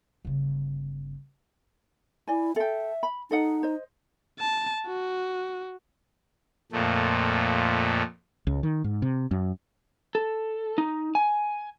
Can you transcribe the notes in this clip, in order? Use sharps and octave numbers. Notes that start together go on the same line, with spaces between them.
G1 C#3
E4 D5 G#5
A4 E5 G5
B5
D#4 A4 D#5 F#5
C5 D#5
A5
F#4
F2 A#2 A3
C#2
D#3
G#2
C3
F#2
A4
D#4
G#5